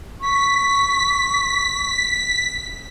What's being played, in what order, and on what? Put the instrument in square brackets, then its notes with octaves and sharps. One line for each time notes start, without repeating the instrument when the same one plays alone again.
[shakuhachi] C#6 [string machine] B6